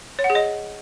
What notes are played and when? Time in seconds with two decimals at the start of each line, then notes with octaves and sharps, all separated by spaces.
0.19 C#5
0.24 F#5
0.30 G#4
0.35 D#5